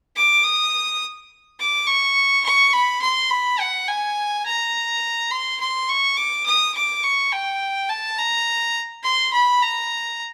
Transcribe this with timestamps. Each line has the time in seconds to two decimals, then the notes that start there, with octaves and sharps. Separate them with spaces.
0.16 D6
0.43 D#6
1.59 D6
1.87 C#6
2.44 C#6
2.73 B5
3.02 C6
3.31 B5
3.60 F#5
3.87 G#5
4.46 A#5
5.31 C6
5.60 C6
5.89 C#6
6.17 D6
6.46 D#6
6.74 D6
7.04 C#6
7.33 G5
7.89 A5
8.18 A#5
9.04 C6
9.33 B5
9.62 A#5